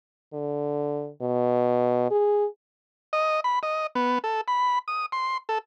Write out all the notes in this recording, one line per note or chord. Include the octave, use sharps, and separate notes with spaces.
D3
B2
G#4
D#5
B5
D#5
B3
A4
B5
D#6
C6
A4